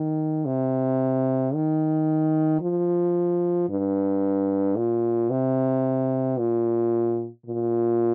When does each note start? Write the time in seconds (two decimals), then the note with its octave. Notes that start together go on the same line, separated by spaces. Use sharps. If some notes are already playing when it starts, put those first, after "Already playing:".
Already playing: D#3
0.46 C3
1.54 D#3
2.61 F3
3.69 G2
4.76 A#2
5.30 C3
6.39 A#2
7.46 A#2